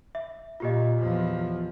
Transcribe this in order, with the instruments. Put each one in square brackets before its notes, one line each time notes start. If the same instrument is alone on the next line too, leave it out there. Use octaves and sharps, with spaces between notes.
[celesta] E5
[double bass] A#2 [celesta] F4 G4 D#5
[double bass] E2 F3